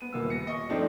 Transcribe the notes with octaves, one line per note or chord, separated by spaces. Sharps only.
B3 D#7
D#1 A#3 B3 E6
A#6 C#7
D#5 C#6
F3 A3 C4 D4 D#4